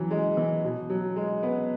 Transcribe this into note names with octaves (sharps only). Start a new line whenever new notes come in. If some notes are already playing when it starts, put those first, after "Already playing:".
Already playing: E3 F#3
G#3
E3
B2
F#3
G#3
B3